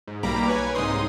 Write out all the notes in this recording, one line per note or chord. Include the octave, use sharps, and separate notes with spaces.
G#2
B1 G3 A#3 A#5 B5 D6
B4 C#5 G#5
C2 G#2 D#4 C6 D#6